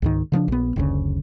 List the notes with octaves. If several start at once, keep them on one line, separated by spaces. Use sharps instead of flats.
C#2 G#2 D#3
C#3 F3 G3 D4
A#1 B3
F#1 D2 C#3